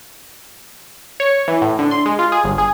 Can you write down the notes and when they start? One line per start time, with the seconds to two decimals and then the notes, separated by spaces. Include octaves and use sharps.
1.20 C#5
1.48 E3
1.62 A2
1.79 D3
1.91 C6
2.06 G#3
2.19 F4
2.32 G#4
2.44 G1
2.58 G#4